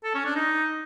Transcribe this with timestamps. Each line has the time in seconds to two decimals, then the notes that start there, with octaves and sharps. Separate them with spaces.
0.04 A4
0.14 C#4
0.25 D4
0.36 D#4